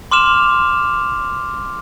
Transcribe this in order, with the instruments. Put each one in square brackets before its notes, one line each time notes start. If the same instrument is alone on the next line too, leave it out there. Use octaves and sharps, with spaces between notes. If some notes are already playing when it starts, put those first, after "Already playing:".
[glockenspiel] C6 D6 F6 E7 F7